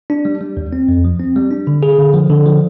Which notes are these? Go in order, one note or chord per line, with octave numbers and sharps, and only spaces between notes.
D4
G3
G3
D#2
C4
F2
F3
C4
G3
D4
D3
G#4
D3
F3
D3
F3